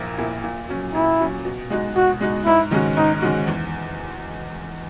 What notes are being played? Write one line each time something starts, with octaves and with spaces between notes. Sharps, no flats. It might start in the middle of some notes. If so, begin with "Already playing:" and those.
Already playing: A#1 A#2 A#3 E4
A#2 A#3 E4
A#2
F#3 C#4
A#2 E4
F#3 C#4
B2
G#3 D#4 F#4
B2 F#4
G#3 D#4 F#4
G#2 E4
D#3 G#3 C#4 F#4
G#2 D#4
D#3 G#3 C#4 F#4
E2